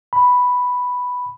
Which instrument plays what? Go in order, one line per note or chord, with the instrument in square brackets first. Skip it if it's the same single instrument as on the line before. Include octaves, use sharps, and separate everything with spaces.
[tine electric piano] B5